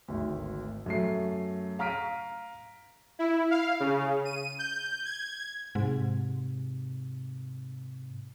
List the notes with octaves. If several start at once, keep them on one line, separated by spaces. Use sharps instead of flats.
G#1 D2
F#2 A3 C7
F5 A#5 F6 B6 D7 D#7
E4
F5
C#3
D#7
G6
G#6
G#2 C3